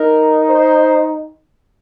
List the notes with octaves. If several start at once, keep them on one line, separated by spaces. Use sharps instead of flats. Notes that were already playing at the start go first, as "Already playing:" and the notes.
Already playing: D#4 A#4
C5